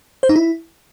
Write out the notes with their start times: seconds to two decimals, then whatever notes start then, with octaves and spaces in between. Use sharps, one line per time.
0.23 C5
0.29 D#4
0.36 E4